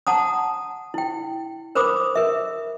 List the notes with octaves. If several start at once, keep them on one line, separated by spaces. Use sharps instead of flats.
F#5 A5 A#5 D#6
E4 G5
A#4 C5 B5 D6 D#6
A#4 E5